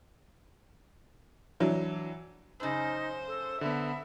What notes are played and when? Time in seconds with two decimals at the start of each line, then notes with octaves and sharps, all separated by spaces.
1.60 E3 F#3 D4
2.60 F#2 C#3 D#4 C5
3.27 A4
3.61 D3 B3 E5 B5